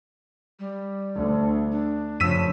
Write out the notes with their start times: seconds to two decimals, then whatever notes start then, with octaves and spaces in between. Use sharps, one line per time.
0.59 G3
1.15 D2
1.72 D4
2.20 F#2 C#3 F3 E6 B6 D#7